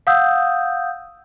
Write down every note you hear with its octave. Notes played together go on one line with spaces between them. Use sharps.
F5 F#5 D#6 E6 G6